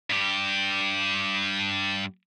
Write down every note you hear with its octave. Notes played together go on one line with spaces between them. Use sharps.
G2 G4